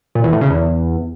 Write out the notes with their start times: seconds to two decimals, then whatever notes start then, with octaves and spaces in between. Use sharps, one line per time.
0.15 A#2
0.24 E2
0.33 A2
0.41 C#3
0.50 E2